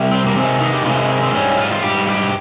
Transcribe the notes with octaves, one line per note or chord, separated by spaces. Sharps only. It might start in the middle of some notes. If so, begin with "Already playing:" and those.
Already playing: C3 G3
C4
A#3
C3 D#3 G#3 C4
D#4
G4
C3 D#3 G#3 F4
D#4
C4
C4
G#2 G3 C#4
F4
F4
G#2 G3 G4
G4